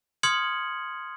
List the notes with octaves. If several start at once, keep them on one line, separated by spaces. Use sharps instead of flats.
C6 D#6 F6 G#6 C#7 F#7